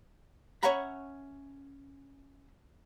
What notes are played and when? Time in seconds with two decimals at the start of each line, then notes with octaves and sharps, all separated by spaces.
0.63 C#4 C#5 E5 F#5 A#5 B5